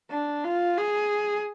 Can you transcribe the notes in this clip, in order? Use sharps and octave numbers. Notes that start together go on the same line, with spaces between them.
D4
F4
G#4